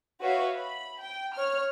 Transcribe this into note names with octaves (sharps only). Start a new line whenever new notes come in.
F#4 B4 C#5 E5 F5
B5
G5
C#5 F6